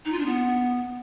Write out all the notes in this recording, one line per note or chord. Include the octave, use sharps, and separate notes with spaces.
D#4
F4
D4
B3